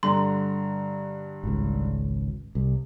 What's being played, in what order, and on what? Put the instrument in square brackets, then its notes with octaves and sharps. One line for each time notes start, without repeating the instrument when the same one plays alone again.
[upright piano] G2 D3 A#5 [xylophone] C6
[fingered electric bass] G#1 C#2
C2